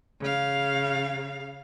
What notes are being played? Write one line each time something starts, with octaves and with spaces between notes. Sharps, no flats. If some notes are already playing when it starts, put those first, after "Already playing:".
C#3 F5